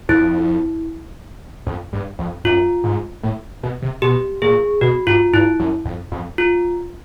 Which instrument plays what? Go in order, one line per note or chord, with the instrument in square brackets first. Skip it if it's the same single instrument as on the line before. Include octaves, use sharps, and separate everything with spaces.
[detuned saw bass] F2 [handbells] E4
[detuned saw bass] F2
G2
F2
[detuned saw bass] F#2 [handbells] F4
[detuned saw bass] G#2
A2
B2
C3
[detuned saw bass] B2 [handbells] G4
[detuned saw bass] A#2 [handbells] G#4
[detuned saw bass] B2 [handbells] F#4
[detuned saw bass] G2 [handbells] F4
[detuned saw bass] G2 [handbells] E4
[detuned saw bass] F#2
F2
F2
[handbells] F4